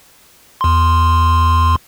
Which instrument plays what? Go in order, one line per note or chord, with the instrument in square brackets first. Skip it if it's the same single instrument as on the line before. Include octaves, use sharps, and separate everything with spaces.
[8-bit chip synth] E2 C6